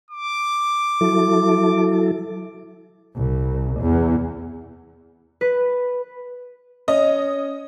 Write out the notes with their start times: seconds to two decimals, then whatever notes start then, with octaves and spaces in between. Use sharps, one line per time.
0.11 D6
1.01 F#3 E4 A4
3.16 C2
3.81 E2
5.41 B4
6.88 C#4 D#5